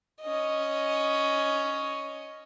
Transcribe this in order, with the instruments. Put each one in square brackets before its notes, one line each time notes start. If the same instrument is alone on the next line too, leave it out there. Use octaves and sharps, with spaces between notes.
[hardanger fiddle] C#4 D#5